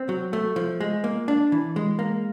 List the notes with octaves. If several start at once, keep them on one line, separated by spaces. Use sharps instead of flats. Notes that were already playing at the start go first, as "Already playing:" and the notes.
Already playing: C4
F#3
A3
F3
G#3
A#3
D4
E3
G#3
A#3